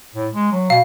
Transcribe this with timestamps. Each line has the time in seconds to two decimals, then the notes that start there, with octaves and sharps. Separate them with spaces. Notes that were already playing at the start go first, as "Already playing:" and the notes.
0.15 A2
0.33 G#3
0.51 F#3
0.70 B2 F5